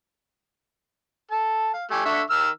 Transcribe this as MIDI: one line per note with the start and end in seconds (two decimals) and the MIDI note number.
1.31 1.72 69
1.31 1.72 81
1.74 1.85 77
1.91 2.01 57
1.91 2.01 67
1.91 2.01 80
2.05 2.22 50
2.05 2.22 76
2.05 2.22 85
2.30 2.49 51
2.30 2.49 88
2.30 2.49 89